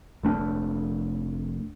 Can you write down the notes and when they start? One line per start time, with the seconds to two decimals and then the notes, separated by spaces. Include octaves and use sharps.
0.23 F1 A3 D4